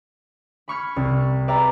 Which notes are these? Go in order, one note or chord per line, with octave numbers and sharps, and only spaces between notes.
B5 C#6 F6 G#6
C2
B4 D5 E5 G5 A#5